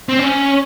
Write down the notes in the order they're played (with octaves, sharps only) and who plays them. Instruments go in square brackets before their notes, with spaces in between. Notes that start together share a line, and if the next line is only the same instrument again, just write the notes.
[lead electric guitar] C4
C#4